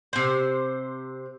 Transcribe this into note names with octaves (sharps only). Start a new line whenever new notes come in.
C3 C5